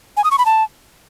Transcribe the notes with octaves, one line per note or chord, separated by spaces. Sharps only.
G#5
D#6
C#6
B5
A5